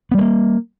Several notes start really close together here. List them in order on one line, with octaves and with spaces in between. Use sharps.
B3 G3 G#3 A#3